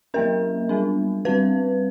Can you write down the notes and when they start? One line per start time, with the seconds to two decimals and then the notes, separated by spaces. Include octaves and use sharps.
0.14 F#3 A#3 C#4 A#4
0.69 G3 B3 D4
1.25 G3 C4 B4